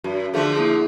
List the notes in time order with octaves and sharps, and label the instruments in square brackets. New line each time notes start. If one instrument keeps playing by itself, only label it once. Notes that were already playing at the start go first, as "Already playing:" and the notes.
[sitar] F#2 [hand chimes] F#4
[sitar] D3 F3 A3 [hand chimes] G#4
[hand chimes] A#3 E4 G#4